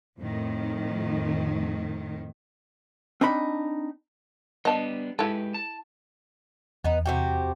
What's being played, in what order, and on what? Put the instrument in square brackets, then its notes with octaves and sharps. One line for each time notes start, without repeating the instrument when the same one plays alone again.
[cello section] F2 A2 D#3
[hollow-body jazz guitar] C4 D4 D#4 B5
[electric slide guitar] G3 B3 D4 [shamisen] D#5 A5
[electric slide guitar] G#3 G4 B4 [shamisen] E4 A4
[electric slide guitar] A5
[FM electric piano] E2 [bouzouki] B3 D#4
[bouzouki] C3 F#4 G4